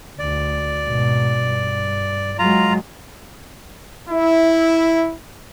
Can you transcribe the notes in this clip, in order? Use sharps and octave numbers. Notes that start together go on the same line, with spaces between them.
D2 D5
G#2 B2
G2
F#3 G#3 F4 A#5
E4